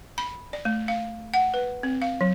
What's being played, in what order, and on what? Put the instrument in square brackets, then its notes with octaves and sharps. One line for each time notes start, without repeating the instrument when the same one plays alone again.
[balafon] B5
D5
A3
F5
F#5
B4
C4
F5
F#3